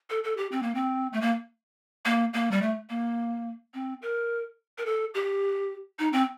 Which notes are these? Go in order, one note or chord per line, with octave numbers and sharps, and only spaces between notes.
A4
A4
G4
C4
A#3
C4
A3
A#3
A#3
A#3
G3
A3
A#3
C4
A#4
A#4
A4
G4
D#4
C4